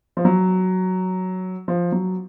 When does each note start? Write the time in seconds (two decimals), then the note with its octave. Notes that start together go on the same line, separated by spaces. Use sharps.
0.17 F3
0.25 F#3
1.68 F3
1.92 F#3